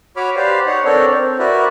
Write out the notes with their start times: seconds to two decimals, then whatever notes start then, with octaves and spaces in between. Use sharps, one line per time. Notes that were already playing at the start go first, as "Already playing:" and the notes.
0.17 F#4 C#5 B5 D6 F6
0.36 G4 B4 C5 D5 F5
0.66 D#4 C#5 F#5
0.85 C4 D4 A4 A#4 C#5 D5
1.10 C4
1.39 E4 F#4 A#4 B4 D5